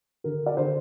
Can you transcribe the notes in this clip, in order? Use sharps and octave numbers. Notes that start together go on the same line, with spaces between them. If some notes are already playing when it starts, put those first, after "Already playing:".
D3 A#4
D5
D3 C5